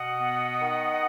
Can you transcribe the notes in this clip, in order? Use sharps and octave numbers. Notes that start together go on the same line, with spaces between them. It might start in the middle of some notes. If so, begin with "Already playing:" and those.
Already playing: B2 D#5 F#5
B3
D#3